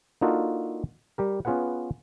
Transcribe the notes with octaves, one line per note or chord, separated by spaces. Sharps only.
A#3 D4 D#4 F4 F#4 A4
G3 G4 A#4
B3 C#4 F4 G#4 B4 F#5